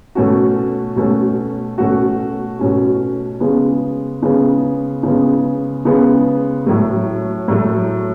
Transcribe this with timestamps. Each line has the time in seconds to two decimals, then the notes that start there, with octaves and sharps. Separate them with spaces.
0.15 B2 A3 C#4 F#4
0.96 B2 A3 C#4 F#4
1.78 B2 A3 C#4 F#4
2.59 B2 A3 C#4 F#4
3.40 C#3 G#3 B3
4.22 C#3 G#3 B3
5.03 C#3 G#3 B3
5.85 C#3 G#3 B3
6.66 A2 F#3 A3
7.48 A2 F#3 A3